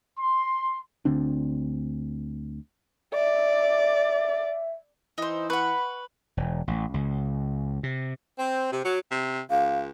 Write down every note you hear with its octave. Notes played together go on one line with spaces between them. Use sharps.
C6
D2 D3 C4 D4
D5 E5
E3 D#4 C5
B4 F#5 B5 C#6
E1
A1
C#2
C3
C4
C3
F#3
C3
C#2 F5